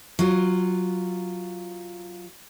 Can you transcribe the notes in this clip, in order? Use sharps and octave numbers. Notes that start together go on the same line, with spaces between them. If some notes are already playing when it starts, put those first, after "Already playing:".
F#3 F4